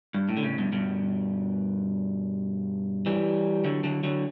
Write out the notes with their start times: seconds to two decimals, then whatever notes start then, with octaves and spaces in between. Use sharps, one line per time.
0.14 G2
0.29 A2
0.37 D3
0.43 A2 C#3
0.58 G2 B2
0.72 G2 B2
3.06 E3 G3
3.65 D3 F#3
3.84 D3 F#3
4.03 D3 F#3